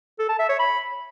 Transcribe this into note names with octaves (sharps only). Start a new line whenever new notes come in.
A4
A5
E5
C#5
B5